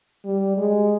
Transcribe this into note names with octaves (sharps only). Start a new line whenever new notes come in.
G3
G#3